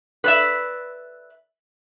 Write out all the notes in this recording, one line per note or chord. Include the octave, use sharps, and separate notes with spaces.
B4 D5 E5